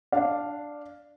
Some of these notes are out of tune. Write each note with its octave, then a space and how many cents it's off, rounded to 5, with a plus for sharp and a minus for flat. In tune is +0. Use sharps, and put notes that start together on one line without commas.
D4 +0 F5 +0